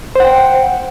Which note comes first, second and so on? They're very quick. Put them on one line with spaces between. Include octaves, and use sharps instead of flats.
C5 F#5 G5